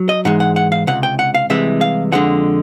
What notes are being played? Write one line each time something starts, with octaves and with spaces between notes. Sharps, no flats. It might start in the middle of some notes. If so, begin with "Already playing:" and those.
Already playing: F#3
D#5
G#2 E3 G#3 F#5
F#5
F#5
F5
C#2 C3 F#5
G5
F#5
F5
C2 C3 E3 G#3 E5
F5
F2 D3 F3 G#3 F#5